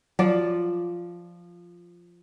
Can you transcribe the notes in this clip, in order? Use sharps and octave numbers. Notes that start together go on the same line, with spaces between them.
F3 F#3 D5